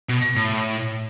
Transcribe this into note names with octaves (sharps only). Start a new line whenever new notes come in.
B2
A2